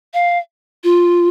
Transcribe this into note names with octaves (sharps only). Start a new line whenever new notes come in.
F5
F4